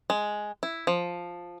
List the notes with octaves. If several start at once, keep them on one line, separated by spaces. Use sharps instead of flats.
G#3
E4
F3